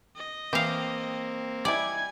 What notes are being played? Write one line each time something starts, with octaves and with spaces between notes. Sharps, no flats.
D#5
E3 A#3 C4 G4 F5
G3 D#4 E4 D5 G#5 G#6